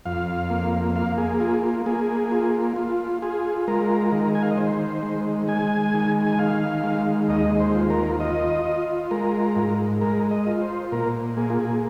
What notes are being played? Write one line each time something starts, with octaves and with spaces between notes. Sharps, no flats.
F2 F5
A#3
A#3 F5
G#4
F4 G#4
F4
A#3 G#4
F4
F4
F4 G#4
G#3 A#4
D#3
G#5
F5
D#5
D#3 C5
G#3
G#3 G#5
D#3
G#5
D#3 F5
G#3
D#2 D#5
C5
F4
A#4
F4 D#5
F4
G#3 A#4
G#2
G#3 A#4
D#5
F4
C5
A#2 A#4
A#3 G#4
F4
G#4